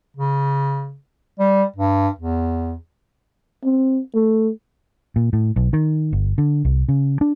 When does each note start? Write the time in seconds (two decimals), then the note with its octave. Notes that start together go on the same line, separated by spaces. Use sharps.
0.17 C#3
1.39 G3
1.76 G2
2.18 E2
3.64 C4
4.14 A3
5.16 A#2
5.33 A2
5.56 B1
5.73 D#3
6.13 G1
6.38 D3
6.65 C2
6.89 C#3
7.21 D4